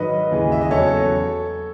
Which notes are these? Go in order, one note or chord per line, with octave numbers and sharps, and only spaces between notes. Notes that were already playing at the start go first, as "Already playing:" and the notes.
Already playing: G#2 D#3 F#3 B4 D#5
D#2 C#3 E3 G#3
E5
D#5
E2 C#3 F#3 A4 C#5